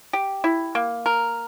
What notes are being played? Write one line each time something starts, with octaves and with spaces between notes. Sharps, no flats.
G4
E4
A#3
A#4